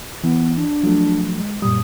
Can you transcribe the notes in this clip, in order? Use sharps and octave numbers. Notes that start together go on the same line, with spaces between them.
E3 B3
D4
F3 F#3 A3
G#3
F#2 A#2 G3 D#6